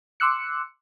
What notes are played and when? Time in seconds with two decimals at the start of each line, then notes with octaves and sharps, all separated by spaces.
0.20 C6 D6 E6 F#6 C#7